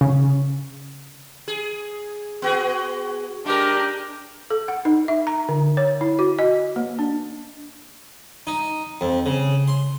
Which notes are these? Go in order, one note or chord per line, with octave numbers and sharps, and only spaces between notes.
C#3
G#4
B3 F#4 G#4
G#3 D4 G4 A#4
A4
F#5
D#4
E5
A#5
D3
C#5
E4
F#4
D#5
A#3
D4
D#4
F2
C#3
C6